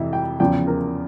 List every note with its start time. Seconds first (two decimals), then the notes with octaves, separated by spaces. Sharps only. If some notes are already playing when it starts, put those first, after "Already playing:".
Already playing: F2 C3 E3 E5
0.13 G5
0.40 E2 C#3 F3 G5
0.67 A#4